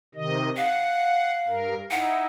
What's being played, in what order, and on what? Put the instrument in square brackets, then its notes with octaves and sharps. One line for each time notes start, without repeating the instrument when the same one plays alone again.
[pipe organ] C3 D#3 D#5
[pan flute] F5 [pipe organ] F#5
[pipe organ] G2 A#4
[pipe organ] D#4 E4 [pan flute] F#5